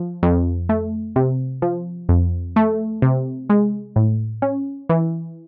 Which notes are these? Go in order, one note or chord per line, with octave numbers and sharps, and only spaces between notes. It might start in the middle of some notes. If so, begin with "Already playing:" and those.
Already playing: F3
F2
A3
C3
F3
F2
A3
C3
G#3
A2
C#4
E3